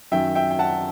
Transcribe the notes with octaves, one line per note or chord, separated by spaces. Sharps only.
F#2 D#3 F#3 E5 G5
E5 G5
G5
F#5 A5